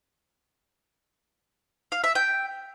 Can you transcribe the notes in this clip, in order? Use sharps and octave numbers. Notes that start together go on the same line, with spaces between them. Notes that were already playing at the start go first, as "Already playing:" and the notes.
F5
E5
G5